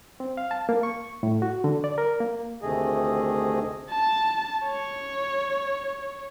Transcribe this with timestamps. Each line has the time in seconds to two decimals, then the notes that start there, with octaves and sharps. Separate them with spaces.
0.20 C4
0.37 F5
0.51 A5
0.69 A#3
0.83 C#6
1.23 A2
1.42 F#4
1.64 D3
1.84 D5
1.98 A#4
2.20 A#3
2.62 D2 C3 D#3 A3 G#4 D#5
3.90 A5
4.65 C#5